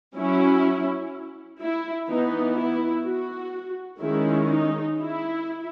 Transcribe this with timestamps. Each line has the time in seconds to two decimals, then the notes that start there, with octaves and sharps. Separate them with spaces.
0.16 F#3 C#4 E4
1.60 E4
2.08 E3 B3 D#4
2.57 E4
3.05 F#4
4.01 D#3 G#3 C#4 E4
4.50 D#4
4.99 E4